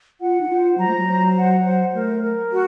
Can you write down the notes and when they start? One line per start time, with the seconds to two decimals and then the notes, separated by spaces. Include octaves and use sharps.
0.21 F4 F#5
0.41 D#4
0.49 F4 C5
0.78 F#3 A#5
0.87 A3
0.96 F#3
1.07 C5
1.36 F#5
1.64 C5
1.93 A3 A#4
2.22 A#4
2.51 F#4